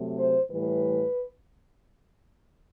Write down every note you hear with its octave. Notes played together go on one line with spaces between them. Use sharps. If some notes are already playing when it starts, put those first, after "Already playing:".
Already playing: C3 F#3 A3
C5
A2 E3 G3 B4